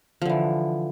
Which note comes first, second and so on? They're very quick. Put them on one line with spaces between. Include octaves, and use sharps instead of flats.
F3 D3 E3